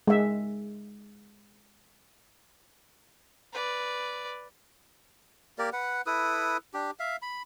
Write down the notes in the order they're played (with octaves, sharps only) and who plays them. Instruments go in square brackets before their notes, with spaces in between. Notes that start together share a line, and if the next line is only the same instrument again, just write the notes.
[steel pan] G#3 E5
[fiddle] B4 D5
[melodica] A#3 G4 A#4 D5
B4 F#5
E4 A4 B4 D#6
D4 G4
E5 F5
B5